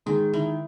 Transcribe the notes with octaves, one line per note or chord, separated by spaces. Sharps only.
D#3 G#3
D#3 E4